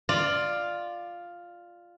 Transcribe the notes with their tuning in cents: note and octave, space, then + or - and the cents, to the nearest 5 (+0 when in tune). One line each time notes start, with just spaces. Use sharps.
F4 +0 D5 +15